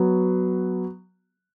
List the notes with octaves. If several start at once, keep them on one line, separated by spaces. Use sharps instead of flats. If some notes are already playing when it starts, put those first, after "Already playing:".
Already playing: F#3 B3 F#4